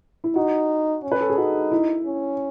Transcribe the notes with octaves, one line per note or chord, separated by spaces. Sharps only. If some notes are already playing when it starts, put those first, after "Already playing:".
E4
D#4 F#4
C#4
B4
A4
G#4
D#4 F#4
E4
C#4